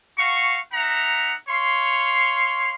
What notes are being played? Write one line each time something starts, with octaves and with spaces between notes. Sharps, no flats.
F#4 F5 C#6
D#4 E5 F#5 A#5
C#5 F5 C6